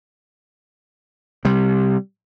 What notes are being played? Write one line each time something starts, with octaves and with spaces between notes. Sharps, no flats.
C3 G3